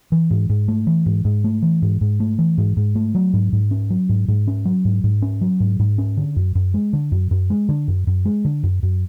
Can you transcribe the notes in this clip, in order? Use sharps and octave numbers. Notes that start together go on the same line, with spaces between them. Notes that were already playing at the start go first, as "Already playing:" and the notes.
E3
G#2
G#2
A3
E3
G#2
G#2
A3
E3
G#2
G#2
A3
E3
G#2
G#2
A3
F#3
G#2
G#2
C#4
F#3
G#2
G#2
C#4
F#3
G#2
G#2
C#4
F#3
G#2
G#2
C#4
D3
F#2
F#2
G#3
D3
F#2
F#2
G#3
D3
F#2
F#2
G#3
D3
F#2
F#2